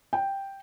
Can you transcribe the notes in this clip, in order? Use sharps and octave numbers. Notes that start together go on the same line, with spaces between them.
G5